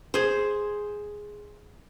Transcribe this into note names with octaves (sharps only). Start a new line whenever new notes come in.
G#4 C5